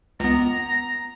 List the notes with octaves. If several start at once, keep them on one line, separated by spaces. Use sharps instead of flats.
C#2 B3 A#5